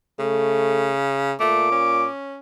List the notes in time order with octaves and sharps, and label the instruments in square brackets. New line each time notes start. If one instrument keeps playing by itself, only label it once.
[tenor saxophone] C#3 [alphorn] A3
[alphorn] A#2 [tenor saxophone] A3 [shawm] D6
[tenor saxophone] C#4